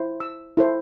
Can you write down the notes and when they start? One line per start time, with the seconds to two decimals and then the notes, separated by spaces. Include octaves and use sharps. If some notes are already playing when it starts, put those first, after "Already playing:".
Already playing: E4 C5
0.20 E6
0.57 E4 A4 C5